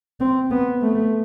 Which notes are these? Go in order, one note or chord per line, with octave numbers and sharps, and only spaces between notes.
C4
B3
A3